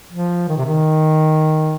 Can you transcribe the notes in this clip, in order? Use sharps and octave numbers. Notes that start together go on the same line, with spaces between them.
F3
D#3
C3
D#3